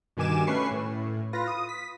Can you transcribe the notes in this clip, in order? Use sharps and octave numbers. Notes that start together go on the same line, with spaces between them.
G2 B2 D#3 G#5 D6 E7
A3 C#4 B4 C#6 C7
A2
F4 B4 A#6
D#6
B6